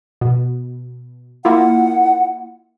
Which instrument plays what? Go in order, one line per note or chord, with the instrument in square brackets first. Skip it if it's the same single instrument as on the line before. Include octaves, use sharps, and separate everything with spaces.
[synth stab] B2
[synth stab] A#3 E4 F4 [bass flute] F#5